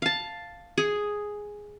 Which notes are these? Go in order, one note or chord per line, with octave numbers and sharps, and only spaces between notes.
F5 A5
G#4